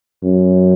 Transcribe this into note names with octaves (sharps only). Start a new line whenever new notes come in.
F#2